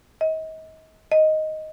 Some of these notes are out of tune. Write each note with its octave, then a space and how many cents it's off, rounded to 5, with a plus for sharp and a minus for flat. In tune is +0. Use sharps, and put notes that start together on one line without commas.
D#5 +35
D#5 +5